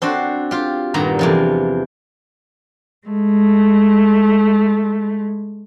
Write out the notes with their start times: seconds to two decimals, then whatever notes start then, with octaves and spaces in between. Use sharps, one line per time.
0.02 C4 D4 F#4 C5
0.51 F4 G4
0.94 G2 A#2 D#3 B3 A#5
1.19 E2 C3 F3
3.08 G#3 A3